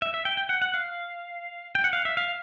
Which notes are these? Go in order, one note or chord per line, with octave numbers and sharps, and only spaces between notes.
E5
E5
G5
G5
F#5
F#5
F5
G5
F#5
F5
E5
F5